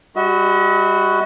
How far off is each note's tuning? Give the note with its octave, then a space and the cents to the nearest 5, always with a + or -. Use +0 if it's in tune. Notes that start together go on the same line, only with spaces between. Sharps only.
G3 +25 F#4 +0 D#5 +45